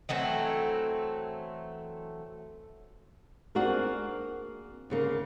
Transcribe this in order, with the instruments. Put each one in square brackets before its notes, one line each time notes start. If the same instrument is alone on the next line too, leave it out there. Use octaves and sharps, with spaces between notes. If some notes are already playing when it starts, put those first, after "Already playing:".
[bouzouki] E3 F#3 A3 C4
[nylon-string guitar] A#3 C4 D4 F#4 G#4 A#4
D2 C#3 A#3